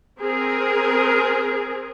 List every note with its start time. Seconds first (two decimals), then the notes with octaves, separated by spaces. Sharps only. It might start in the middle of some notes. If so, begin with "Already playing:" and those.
0.19 C4 G#4 A#4